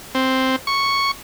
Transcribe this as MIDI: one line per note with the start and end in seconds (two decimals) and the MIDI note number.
0.15 0.56 60
0.67 1.11 85